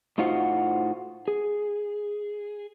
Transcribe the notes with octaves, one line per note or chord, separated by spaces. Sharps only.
A2 D#4 F4 F#4 C5 F#5
G#4